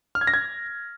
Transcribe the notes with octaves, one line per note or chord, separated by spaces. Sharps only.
F6
G#6
A#6
G#6